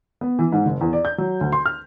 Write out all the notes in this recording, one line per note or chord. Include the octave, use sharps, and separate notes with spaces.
B3
E3
G#2
F#1
E2
D5
G6
F#3
D2
C6
F6